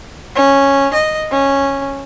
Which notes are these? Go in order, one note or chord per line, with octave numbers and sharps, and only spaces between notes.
C#4
D#5
C#4